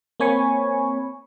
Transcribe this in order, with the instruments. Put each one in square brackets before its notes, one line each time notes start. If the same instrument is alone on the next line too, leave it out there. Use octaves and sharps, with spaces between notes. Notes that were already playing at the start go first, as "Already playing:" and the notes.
[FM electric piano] A#3 C4 C#5 G#5 B5 C#6